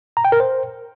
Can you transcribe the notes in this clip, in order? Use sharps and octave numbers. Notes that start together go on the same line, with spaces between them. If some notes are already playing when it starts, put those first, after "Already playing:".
A#5
G5
A#4
C5